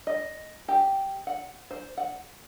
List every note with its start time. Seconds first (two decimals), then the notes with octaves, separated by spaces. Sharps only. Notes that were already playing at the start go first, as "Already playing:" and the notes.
0.07 D#5
0.68 G4
1.27 F#5
1.71 C5
1.97 F#5